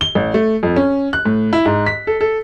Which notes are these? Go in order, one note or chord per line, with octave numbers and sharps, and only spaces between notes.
G7
A1
A3
F2
C#4
F#6
A2
E4
G#2
B6
A4
A4